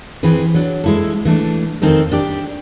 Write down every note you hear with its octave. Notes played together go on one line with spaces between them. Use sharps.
E3 C4 G#4 B4
F#3 D4
G#3 E4 A4
E3 A3 D4
F2 D#3 C4 D#4 A4
D4 G4 D5